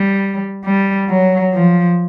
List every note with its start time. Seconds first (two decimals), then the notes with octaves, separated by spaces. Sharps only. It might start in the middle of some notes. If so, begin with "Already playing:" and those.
Already playing: G3
0.65 G3
1.09 F#3
1.54 F3